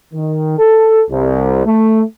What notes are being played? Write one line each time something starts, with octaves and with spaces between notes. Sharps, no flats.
D#3
A4
C2
A3